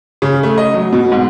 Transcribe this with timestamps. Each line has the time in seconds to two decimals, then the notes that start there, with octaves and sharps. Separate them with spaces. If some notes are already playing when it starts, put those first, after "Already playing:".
0.22 C#3
0.43 A3
0.58 D#5
0.74 F#3
0.93 B2
1.12 G#2